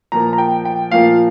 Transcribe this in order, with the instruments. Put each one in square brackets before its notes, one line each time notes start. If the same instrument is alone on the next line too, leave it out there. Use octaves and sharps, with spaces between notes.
[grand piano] A#2 F3 A#3 A#5
A#5
G5
G5
A#2 F3 A#3 F5